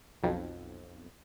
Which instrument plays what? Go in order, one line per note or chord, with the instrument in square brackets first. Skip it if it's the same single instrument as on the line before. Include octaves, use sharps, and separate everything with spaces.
[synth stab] B1 F2